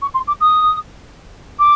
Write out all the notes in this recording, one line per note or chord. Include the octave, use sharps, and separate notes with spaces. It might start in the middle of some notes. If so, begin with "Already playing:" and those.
C#6
C6
D6
D#6
D6